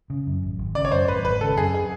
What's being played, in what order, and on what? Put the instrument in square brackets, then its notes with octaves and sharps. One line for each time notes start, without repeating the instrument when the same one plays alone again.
[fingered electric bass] C#3
F#2
G#1
G#1
[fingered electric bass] C#3 [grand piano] D5
[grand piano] C#5
[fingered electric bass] F#2 [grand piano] C5
[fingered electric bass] G#1 [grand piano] B4
[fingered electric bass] G#1 [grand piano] B4
[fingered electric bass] C#3 [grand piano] A4
[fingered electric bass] F#2 [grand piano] G#4
[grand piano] G#4